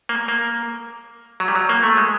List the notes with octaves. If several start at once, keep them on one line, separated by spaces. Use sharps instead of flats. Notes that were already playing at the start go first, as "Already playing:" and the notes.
A#3
A#3
F#3
G3
F#3
A#3
A3
G#3